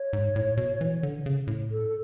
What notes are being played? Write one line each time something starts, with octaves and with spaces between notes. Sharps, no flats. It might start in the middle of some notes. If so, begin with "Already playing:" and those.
Already playing: C#5
G#2
A2
B2
E3
D3
C#3
A2
A4
A4